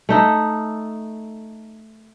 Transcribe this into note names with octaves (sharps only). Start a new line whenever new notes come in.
A3 D#4 A4